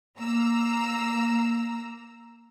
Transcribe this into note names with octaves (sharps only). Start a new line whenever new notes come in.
A#3 A#5 E6